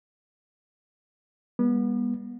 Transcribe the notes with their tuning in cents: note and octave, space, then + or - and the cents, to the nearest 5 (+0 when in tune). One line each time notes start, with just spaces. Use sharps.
G3 +35 B3 -30